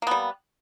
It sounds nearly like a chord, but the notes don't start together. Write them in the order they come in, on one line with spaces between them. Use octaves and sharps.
A#3 B3 G3